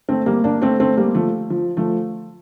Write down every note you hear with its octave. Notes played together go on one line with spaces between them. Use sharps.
A3 C4
G3 A#3
A#3 D4
A3 C4
A3 C4
G3 A#3
F3 A3
F3
F3 A3